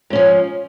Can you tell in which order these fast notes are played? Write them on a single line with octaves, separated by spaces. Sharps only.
G#2 C#4 F3